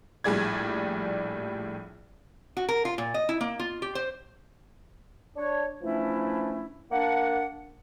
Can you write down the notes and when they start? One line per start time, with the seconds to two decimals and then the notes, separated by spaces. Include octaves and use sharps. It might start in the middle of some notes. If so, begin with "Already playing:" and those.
0.24 A#1 A2 G3 G#4 D5 G#6
2.57 F#4
2.69 A#4
2.85 F4
2.98 A#2
3.14 D#5
3.29 E4
3.41 A#3
3.59 F4
3.82 G4
3.95 C5
5.36 D4 C#5
5.82 E3 F3 A3 C#4 D4 E4
6.92 A#3 D4 F#5